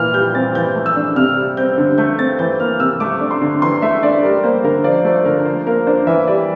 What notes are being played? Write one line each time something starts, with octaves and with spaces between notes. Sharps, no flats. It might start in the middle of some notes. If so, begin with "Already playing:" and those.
Already playing: A#2 E3 F6
G3 G6
C4 A6
E3 G6
A3
E6
D4
C3 F6
G3
C4 G6
D3
A3 G6
C4 A6
E3 G6
A#3 F6
C3 E6
A3 D6
D4
C6
D3
E3 C6
A3 E5
D4 D5
G3 A#4
A#3 C5
D3 A#4
F3 D5
A3 C5
D3 A#4
F3 C5
A#3 A#4
D4 C5
E3 E5
G3 D5